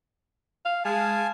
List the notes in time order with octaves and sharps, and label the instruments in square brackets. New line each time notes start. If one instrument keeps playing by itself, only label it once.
[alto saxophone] F5
[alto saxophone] G#3 [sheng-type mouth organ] F5 G#5 A5